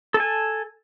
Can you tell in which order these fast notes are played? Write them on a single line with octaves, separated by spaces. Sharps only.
A4 A5 G#5